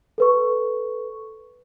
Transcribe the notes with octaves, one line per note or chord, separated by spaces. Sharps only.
A4 B4 C#6